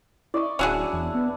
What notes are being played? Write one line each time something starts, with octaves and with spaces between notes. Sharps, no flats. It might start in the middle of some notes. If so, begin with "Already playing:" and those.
E4 D5 D#5 C#6
D1 C#4 D4 E4 F#4 G#4
E2
B3